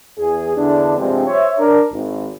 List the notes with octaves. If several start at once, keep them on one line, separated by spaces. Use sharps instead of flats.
E2 G#4
E2 D3 D4
G2 C3 F3 G#3 C4 D4
C5 C#5 E5
D4 A#4
G#1